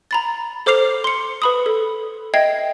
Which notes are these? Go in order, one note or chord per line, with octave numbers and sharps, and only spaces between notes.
A#5 B5 A6
A4 C5 D6 F6 C7 F7
C6 C#7
B4 B5 D#6
A4
D#5 E5 G5 G#6 C7